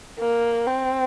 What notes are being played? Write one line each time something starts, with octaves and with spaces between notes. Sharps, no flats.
A#3
C4